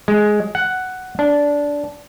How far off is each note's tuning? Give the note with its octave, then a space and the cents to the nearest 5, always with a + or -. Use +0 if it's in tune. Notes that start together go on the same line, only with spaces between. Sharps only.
G#3 +10
F#5 +5
D4 -15